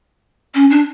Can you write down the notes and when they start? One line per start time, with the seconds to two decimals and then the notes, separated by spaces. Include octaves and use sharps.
0.55 C#4
0.71 D4